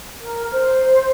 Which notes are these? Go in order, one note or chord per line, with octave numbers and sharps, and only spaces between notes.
A#4
C5